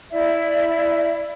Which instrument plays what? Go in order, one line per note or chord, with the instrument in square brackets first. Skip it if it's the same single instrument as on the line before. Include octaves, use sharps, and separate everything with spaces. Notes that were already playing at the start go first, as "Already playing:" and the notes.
[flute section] E4 D5 E5